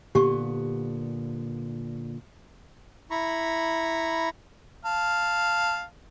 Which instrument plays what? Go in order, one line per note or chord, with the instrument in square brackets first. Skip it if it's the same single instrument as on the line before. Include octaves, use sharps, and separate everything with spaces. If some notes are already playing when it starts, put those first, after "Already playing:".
[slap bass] A#2 D3 B3 [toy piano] G4 C#6
[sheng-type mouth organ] E4 A#5 B5 C#6
[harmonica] F5 A5